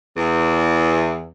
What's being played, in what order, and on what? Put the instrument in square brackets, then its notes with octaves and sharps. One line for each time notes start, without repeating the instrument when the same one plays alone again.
[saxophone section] E2